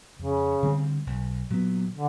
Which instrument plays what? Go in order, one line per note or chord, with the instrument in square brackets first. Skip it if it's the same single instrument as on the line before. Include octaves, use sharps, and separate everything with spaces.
[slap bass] F2 [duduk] C#3
[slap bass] D3 G3 C4
B1
A#2 F#3 B3
[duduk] D3